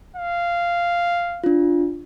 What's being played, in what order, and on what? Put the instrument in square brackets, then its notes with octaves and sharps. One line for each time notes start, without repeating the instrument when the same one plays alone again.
[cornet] F5
[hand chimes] D4 F4